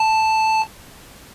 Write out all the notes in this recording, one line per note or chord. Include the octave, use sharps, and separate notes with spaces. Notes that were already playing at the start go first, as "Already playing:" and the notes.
Already playing: A5